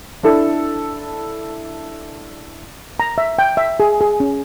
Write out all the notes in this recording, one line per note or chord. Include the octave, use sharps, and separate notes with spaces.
D4 E4 A4
A#5
E5
G5
E5
G#4
G#4
C#4